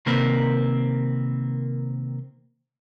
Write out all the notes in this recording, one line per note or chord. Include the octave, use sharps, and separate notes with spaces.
C3 D#3 A#3 C4 A#4 B4